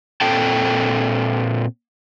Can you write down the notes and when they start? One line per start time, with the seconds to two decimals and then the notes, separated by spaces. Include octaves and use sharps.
0.21 A#2 C4 A4 G5 A5